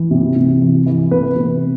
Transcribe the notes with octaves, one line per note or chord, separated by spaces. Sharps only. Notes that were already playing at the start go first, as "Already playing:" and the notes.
Already playing: E3
C3
C3
E3
E3
C3 B4
C3